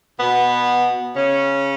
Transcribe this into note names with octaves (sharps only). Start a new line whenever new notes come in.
B2 B3
C#3 C#4